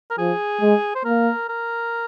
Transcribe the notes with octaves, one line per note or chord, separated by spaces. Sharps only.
A#4
F3 G#4
G#3
C5
A#3 A#4
A#4